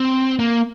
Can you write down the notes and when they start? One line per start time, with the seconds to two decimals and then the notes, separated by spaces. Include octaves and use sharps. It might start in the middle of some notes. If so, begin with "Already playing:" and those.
Already playing: C4
0.39 A#3